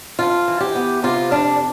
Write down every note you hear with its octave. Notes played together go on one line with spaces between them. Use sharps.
F2 F4
E3
G4
B3
C3 F4
F2 D4